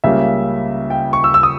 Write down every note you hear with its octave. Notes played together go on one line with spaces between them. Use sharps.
C#2 C#3 G3 A#3 C#4 E5
G5
C#6
E6
E6
D#6